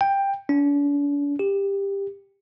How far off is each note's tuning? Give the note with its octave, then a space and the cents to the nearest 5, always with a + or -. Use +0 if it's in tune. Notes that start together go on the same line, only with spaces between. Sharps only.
G5 +10
D4 -45
G4 +15